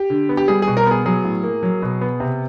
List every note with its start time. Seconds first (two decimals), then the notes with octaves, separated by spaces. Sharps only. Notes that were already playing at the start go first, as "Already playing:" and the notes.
Already playing: G4
0.10 D3
0.29 B3
0.37 G4
0.48 G3 G#4
0.62 G#4
0.68 B2
0.77 A#4
0.86 B3 G#4
1.05 F#3 G#4
1.24 A2
1.44 A#3
1.63 F#3
1.82 B2
2.01 B3
2.20 C3